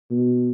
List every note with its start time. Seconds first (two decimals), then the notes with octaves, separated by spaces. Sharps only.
0.11 B2